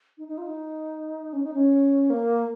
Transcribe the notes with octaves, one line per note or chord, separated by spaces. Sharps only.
D#4
D#4
F4
D#4
C#4
D#4
C#4
A#3